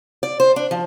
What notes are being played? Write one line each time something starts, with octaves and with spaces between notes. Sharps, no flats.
D5
C5
D4
F3